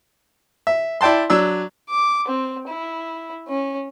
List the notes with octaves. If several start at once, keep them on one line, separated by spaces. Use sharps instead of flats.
E5
E4 D5 G5 A5 C6
F#3 D4 E6
D6
C4
E4
C#4